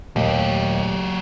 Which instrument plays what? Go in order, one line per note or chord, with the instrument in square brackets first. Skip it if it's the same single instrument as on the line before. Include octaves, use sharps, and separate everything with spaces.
[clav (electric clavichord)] D#2 [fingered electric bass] A#2 A3 A#3 [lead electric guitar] F#3 G4